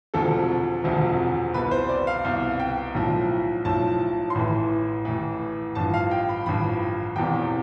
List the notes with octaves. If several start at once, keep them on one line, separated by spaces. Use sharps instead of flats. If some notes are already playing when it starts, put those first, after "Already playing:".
E1 D2 C3 F3 A4
E1 D2 C3 F3
C2 B2 B4
B4
C5
D5
F5
C2 B2 F5
G5
B1 A2 F3
B1 A2 F3 A5
C6
A1 A2 E3 B5
A1 A2 E3
A1 G2 F3 A5
F5
G5
B5
A1 G2 F3 B5
E1 E2 C3 G5